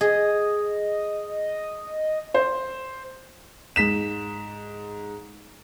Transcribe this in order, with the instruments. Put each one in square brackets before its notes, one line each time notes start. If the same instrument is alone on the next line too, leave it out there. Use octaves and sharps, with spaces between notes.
[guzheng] G#4 [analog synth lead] D#5
[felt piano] C5
[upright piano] G#2 B6 E7